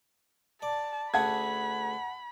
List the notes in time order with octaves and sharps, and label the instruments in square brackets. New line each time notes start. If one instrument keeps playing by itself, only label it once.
[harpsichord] D5 [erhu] A5
[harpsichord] D2 C#4 G#4 [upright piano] F#5 A5 G#6 [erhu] B5